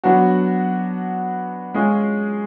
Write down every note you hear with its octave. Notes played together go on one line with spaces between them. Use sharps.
F#3 B3 D4 F#4
G#3 C#4 F4 G#4